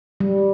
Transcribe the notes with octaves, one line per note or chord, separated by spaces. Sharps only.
G3